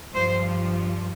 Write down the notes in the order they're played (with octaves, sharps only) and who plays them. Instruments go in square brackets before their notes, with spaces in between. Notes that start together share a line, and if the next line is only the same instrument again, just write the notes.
[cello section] G2 F3 C5